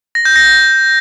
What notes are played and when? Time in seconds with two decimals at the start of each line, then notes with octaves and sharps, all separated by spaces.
0.15 A#6
0.25 G6
0.36 A#6